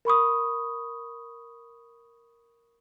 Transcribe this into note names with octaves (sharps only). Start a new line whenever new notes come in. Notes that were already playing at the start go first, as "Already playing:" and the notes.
A#4 B5 C#6 D#6